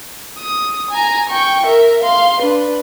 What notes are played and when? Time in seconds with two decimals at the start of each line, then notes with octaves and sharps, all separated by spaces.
0.38 D#6
0.91 G#5 A#5
1.30 G5 C#6
1.66 A#4 E5
2.02 F5 C6
2.40 D4 B4